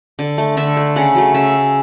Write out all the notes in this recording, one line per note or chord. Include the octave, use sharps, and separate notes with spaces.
D3
A3
D3 E5
A3
C#3 F#5
F#3 A3
C#3 E5